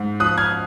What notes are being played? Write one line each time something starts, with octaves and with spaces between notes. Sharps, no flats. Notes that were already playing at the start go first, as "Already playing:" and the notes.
Already playing: G#2
F3 D#6 F#6
F6 G#6